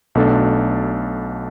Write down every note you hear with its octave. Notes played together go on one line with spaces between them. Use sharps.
B1 B2 A3 D4 A4